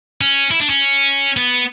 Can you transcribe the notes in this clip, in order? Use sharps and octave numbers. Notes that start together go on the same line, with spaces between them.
C#4
E4
D4
C#4
B3